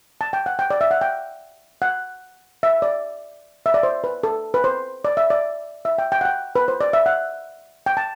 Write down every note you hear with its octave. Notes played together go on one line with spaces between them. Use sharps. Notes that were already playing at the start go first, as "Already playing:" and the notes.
A5
G5
F#5
G5
D5
E5
F#5
G5
F#5
E5
D5
E5
D5
C5
B4
A4
B4
C5
D5
E5
D5
E5
G5
G5
F#5
G5
B4
C5
D5
E5
F#5
G5
A5